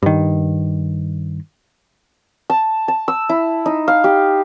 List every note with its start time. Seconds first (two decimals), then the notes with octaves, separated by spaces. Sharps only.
0.03 G2 D#3
2.50 A5
2.88 A5
3.08 E6
3.29 E4
3.66 D#4
3.88 F5
4.04 G4